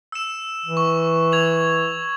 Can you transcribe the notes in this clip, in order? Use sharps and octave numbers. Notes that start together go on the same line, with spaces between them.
E6 E7
E3
C#6
G#6 F7 F#7